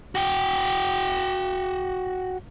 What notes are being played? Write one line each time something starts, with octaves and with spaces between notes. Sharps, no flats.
F#4 G5